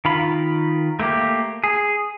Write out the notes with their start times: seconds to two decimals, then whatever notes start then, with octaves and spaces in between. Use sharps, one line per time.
0.05 D#3 F4 B5
1.00 A3 A#3 G4
1.64 G#4